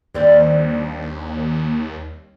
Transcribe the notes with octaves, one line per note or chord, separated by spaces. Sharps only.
D#2 G3 C4 D4